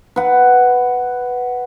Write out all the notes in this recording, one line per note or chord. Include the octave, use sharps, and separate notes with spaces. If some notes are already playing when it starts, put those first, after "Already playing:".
B4 F#5